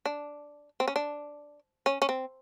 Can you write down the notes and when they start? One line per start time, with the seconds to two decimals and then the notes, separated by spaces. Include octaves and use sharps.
0.06 D4
0.80 C4
0.88 C#4
0.96 D4
1.86 C#4
2.02 C#4
2.09 C4